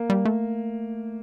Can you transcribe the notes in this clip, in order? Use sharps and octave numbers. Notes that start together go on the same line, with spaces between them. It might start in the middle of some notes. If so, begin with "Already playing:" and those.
Already playing: A#3
G3
A3